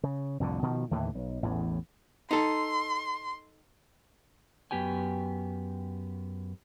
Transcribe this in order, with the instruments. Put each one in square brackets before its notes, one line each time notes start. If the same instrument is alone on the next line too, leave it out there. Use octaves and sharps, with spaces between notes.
[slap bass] C#3
C2 F2 A2 D3
B2 D#3 F3
D#2 A2 D3 E3
B1
A1 E2 A2
[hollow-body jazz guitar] D#4 A4 [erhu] C6
[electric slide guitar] F#2 B3 G4 G5 G#5